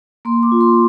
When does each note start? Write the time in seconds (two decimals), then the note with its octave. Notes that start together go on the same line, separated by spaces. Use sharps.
0.25 A#3 C6
0.43 D6
0.52 F4
0.61 C6